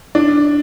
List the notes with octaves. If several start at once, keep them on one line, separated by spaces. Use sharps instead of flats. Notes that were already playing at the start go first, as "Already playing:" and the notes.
D4